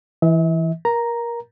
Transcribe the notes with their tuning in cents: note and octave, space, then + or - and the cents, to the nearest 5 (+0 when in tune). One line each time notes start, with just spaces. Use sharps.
E3 +0 E5 -45
A#4 +20 A#5 +0